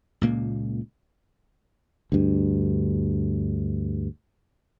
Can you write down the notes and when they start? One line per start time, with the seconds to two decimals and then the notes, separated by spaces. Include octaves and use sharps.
0.21 C#2 A#2 A#3
2.12 D2 G2